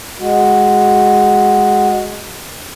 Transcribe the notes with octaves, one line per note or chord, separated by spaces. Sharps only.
G#3 F#4